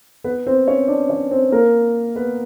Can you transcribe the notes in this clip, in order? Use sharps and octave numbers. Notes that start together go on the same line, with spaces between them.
B3 B4
C4 C5
C#4 C#5
D4 D5
C#4 C#5
C4 C5
A#3 A#4
B3 B4